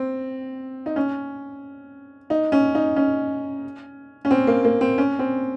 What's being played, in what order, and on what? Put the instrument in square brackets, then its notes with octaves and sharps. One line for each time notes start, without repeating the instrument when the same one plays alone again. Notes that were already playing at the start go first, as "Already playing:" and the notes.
Already playing: [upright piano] C4
D#4
C#4
D#4
C#4
D#4
C#4
C#4
C4
A#3
A#3
C4
C#4
C4